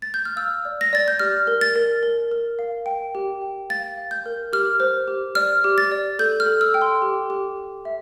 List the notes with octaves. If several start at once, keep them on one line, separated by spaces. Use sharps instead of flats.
A6
G6
F6
F5 E6
D5
A#6
D5 A6
G6
G4 F6
A#4
A6
A#4
A#4
A#4
F5
G5
G4
G5
F5 A6
F5
G6
A#4
G4 F6
C5
G4
D5 F6
G4
A6
D5
A4 G6
F6
A4
E6
G5
C6
G4
G4
G4
E5